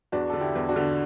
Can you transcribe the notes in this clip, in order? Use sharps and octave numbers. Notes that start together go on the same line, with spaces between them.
E2 D4 F#4
D3 A4
E4 G4
E2
D4 F#4
D3